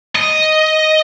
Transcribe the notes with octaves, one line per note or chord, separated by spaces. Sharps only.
D#5